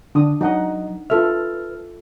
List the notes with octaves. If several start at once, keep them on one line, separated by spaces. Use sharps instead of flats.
D3 D4 D#6
F#3 D#4 D#5 F#5 A#5
F4 A4 B4 E5 F6